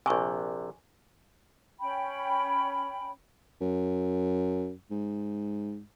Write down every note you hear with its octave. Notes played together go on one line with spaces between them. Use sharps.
A#1 C3 G#5 C#6
C#4 G5 B5
F#2
G#2